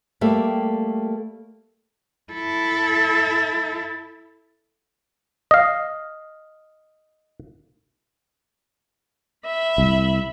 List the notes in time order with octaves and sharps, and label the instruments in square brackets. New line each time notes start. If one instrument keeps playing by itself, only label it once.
[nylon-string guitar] G3 A3 A#3 G4
[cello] E4 A4
[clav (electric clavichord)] D#5 F5
[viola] E5 B5
[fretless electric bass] C2